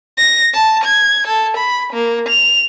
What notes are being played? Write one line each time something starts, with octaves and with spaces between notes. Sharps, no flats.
A#6
A5
G#6
A4
B5
A#3
F7